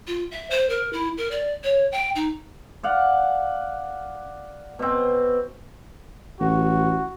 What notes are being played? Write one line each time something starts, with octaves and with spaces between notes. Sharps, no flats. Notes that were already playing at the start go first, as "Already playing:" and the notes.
F4
E5
C5
A#4
E4
A#4
D5
C#5
G5
D#4
D5 F5 F#5
B2 C4
A1 F#4